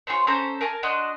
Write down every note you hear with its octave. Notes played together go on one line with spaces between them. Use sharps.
F4 G#4 C5 C#5
C#4 A4 C5 A#5
A#4 G#5 A5
D4 F#4 D#5 C6